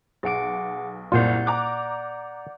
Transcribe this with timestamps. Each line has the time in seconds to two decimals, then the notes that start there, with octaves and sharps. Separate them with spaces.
0.23 B1 G#4 F#5 D6 D7
1.12 F#1 C2 A#2 F4 D5 F#5 G6
1.46 A#5 D6 F#6